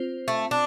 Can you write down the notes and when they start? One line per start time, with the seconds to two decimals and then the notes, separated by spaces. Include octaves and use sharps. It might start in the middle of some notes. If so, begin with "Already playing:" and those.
Already playing: C4 F4 C5
0.28 A3
0.51 D4